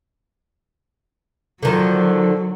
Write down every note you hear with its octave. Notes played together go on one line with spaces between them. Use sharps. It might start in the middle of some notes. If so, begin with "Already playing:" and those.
D3 D#3 F3 F#3